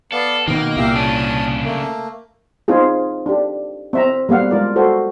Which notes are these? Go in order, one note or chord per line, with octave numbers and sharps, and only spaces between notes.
B3 A4 D5 F5
B2 D#3 A#3 D#5
C2 A#2 G4 E5 F5
C#3 C#4 D4 A5 D#6
A3 A#3
C4 D#4 F4 G#4
D4 G4
C4 E5 A#5
G3 A#3 B3 F5 F#5
G#3 F4 A#4 D5
F#4 A4 C5